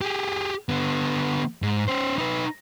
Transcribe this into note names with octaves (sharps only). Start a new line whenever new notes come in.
G4 G#4
D3 B3
G#2
C#4 C5
D#4 B4